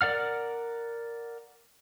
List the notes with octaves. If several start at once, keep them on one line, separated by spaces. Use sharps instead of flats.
A#4 D5 F#5 F6